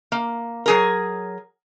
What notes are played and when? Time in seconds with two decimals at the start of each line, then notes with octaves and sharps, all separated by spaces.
0.12 A#3
0.66 F#3 G#4 A#4